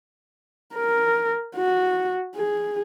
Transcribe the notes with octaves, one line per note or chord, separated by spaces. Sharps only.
A#4
F#4
G#4